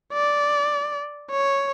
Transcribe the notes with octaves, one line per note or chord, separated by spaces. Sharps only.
D5
C#5